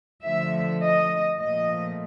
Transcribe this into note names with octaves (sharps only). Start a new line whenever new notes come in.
D3 F3 A3 E5
D#5
A#2 F3 A3 D#5